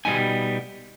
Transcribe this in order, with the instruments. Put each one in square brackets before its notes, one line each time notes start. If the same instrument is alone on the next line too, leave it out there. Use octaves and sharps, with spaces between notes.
[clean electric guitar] B2 G3 B3 D#4 G#5